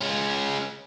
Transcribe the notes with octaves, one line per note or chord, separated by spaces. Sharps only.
G#3 C#4